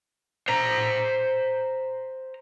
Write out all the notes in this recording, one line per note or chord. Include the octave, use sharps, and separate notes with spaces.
C5 A#5